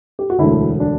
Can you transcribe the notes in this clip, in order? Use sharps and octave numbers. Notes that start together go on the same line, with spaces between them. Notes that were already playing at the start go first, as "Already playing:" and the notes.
G4
F#4
E1 D2 D3 E4
D4